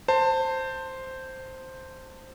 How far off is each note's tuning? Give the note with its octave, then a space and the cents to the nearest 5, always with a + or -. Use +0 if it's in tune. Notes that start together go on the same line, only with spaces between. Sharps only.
C5 +0 A5 +25